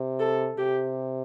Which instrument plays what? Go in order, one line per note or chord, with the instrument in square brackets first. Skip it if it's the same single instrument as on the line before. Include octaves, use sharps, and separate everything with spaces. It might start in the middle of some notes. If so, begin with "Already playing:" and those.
Already playing: [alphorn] C3
[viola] A4
[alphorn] C3 [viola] G4